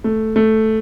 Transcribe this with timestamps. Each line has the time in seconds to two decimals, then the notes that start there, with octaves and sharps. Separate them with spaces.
0.04 A3
0.36 A3